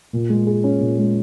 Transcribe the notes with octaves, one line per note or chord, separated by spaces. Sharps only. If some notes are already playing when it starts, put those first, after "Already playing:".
A#2
G#3
G#4
C#4
A#2
G#3